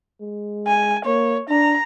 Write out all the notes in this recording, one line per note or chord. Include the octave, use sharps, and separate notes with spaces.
G#3
G#5
A#3 C#5
D4 A#5